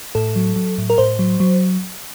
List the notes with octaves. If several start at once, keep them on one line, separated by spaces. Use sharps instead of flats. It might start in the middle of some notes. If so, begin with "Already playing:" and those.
A2 A4
F#3
F#3
A2
A#4
A2 C5
F#3
F#3